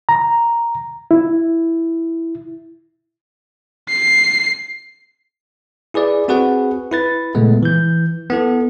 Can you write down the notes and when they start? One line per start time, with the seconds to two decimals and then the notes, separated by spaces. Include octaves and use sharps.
0.09 A#5
1.11 E4
3.90 C7
5.94 E4 G#4 B4 D5 E5
6.28 C4 F#4 G#4 B4 F#5
6.91 E4 B4 A6
7.35 A#2 C#3 G#3 A3 B3
7.63 E3 G6
8.30 B3 E4 A4